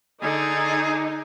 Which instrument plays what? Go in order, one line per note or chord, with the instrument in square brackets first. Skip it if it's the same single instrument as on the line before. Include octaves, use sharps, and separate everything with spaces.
[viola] D3 [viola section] D#4 [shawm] G#4